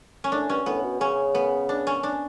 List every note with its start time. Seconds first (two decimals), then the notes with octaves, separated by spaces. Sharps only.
0.24 C#4
0.32 A2 D4
0.49 G2 C#4
0.66 A2 B3
0.83 B2
1.00 C#3 C#4
1.35 B3
1.69 D4
1.87 C#4
2.03 D4